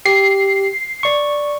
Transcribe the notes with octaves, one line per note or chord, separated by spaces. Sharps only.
G4 C7
D5 C#6